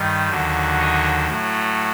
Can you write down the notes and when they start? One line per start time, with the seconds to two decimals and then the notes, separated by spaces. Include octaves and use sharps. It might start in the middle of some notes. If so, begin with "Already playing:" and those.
Already playing: G2 D#3 G3
0.29 D#2 D3 F#3
0.78 C#5 D#5
1.28 A2 F#3 A3